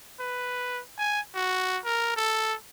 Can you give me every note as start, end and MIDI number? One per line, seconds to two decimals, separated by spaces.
0.20 0.81 71
0.98 1.20 80
1.35 1.78 66
1.85 2.16 70
2.16 2.54 69